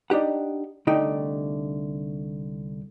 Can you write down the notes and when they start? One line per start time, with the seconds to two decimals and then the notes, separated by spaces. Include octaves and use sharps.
0.10 D4 D#4 G4 F#5
0.87 C2 D3 A3 D#4 G5